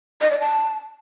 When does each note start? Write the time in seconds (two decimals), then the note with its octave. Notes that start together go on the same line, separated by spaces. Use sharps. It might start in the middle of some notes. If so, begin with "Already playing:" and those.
0.21 D#5
0.31 D5
0.40 A5